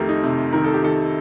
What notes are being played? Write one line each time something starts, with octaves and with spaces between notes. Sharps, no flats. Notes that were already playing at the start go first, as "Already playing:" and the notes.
Already playing: F2 D#3 A3 G4 A#4
D#4
C3
D#3 A#4
A4
G4
D#3 A4